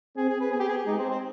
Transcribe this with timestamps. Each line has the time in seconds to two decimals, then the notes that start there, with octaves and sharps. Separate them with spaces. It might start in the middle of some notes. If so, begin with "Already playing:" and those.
0.17 C4 G#4
0.29 G#4
0.40 B4
0.52 B3 G#4
0.60 G4
0.68 G#4
0.77 G4
0.85 G#3 D#4
0.98 C4
1.09 C4